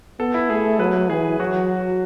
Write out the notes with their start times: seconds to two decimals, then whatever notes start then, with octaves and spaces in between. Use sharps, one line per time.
0.19 B3 A4
0.34 E4
0.49 A3 G#4
0.79 F#3 B4
1.09 E3 G#4
1.40 F#3 F#4